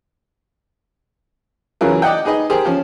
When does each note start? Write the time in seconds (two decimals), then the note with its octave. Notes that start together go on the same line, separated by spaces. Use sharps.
1.81 C#3 E3 F#3 E4 F4 A#4
2.02 D5 D#5 F#5 G5
2.25 D#4 G#4 B4 D#5
2.50 G4 G#4 A#4 C5
2.65 F3 C#4